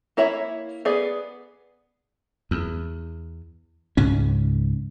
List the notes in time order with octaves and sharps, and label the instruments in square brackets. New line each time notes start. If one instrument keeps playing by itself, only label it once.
[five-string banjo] A#3 E4 C#5 E5 B5
B3 G#4 D5
[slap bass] E2
C#2 G#2 C#4